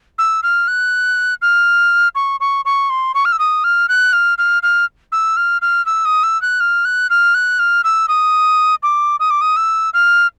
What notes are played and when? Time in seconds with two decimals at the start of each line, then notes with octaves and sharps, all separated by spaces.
0.18 E6
0.43 F6
0.68 F#6
1.42 F6
2.15 C#6
2.40 C#6
2.65 C#6
2.90 C6
3.14 C#6
3.25 F6
3.32 E6
3.39 D#6
3.64 F6
3.89 F#6
4.13 F6
4.38 F6
4.63 F6
5.12 E6
5.37 F6
5.62 F6
5.86 E6
6.05 D#6
6.23 E6
6.42 F#6
6.60 F6
6.85 F#6
7.10 F6
7.34 F#6
7.59 F6
7.84 E6
8.08 D#6
8.83 D6
9.20 D#6
9.30 D6
9.41 D#6
9.56 E6
9.94 F6